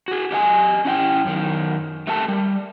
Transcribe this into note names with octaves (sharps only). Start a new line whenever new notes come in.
F#4 G#4
G4 D#5 F5 G#5
C#4 E4 E5 G5
F#2 D#3
A3 G4 A#4 A5
G3